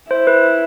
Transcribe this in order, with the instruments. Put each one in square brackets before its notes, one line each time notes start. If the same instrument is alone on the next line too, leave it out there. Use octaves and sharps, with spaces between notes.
[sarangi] E4 [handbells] C5
[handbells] B4